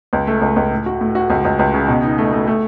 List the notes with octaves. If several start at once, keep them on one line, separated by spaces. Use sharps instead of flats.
C#2
A3
C#2
C#2
A2
F#4
A2
F#4
C#2
C#2
C#2
C#3
B2
D#4
A3
A3
A3